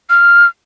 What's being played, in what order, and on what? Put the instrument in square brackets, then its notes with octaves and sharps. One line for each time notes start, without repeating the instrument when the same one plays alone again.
[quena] F6